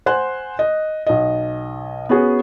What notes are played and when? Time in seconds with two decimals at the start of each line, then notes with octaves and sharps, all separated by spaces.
0.06 C5 F#5 G#5 C6 F#6
0.59 D#5
1.07 B1 D#5
2.09 B3 C#4 F#4 G#4